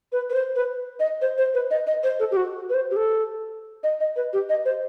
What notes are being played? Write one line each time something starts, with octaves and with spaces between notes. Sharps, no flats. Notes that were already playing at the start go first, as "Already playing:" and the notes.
B4
B4
C5
B4
D#5
C5
C5
B4
D#5
D#5
C5
A4
G4
F#4
B4
C5
G4
A4
D#5
D#5
B4
G4
D#5
C5